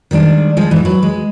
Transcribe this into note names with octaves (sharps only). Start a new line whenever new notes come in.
D#3 G3 G#3 D4
F3 G3 G#3
G#2 E3
F#3 B4
G#3